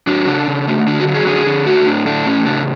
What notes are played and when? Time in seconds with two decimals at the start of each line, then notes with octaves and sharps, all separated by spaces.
0.07 F#3 D4
0.27 C#3 D4
0.48 C#3
0.67 A3
0.87 D3 D4
1.00 F#4
1.07 F#3
1.14 G#4
1.27 D3 G#4
1.47 D3
1.67 A3 F#4
1.86 A2 D4
2.06 A3 D4
2.26 A2 C#4
2.46 C#3 D4